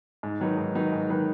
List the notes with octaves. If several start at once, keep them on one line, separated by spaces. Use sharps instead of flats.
G#2
D#3 F#3 D#4 B4
G#2
D#3 F#3 D#4 B4
G#2
D#3 F#3 D#4 B4